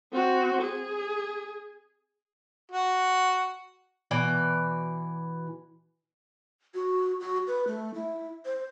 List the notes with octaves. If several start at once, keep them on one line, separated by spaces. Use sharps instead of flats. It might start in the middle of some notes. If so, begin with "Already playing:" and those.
C4 F#4
G#4
F#4
B2 E3 D5
F#4
F#4
B4
A3
E4
C5